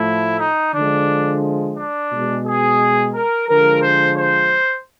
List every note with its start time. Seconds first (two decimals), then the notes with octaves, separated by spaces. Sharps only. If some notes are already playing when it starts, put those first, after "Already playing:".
Already playing: A2 F3 A3 E4
0.40 D#4
0.74 D3 F3 G#3 D4
1.78 D4
2.11 B2 G#3
2.46 G#4
3.14 A#4
3.49 D3 F3 G#3 A#4
3.83 C5
4.17 C5